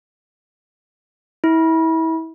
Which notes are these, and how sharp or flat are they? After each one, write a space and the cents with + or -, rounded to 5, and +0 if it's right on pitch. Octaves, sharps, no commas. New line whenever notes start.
E4 -30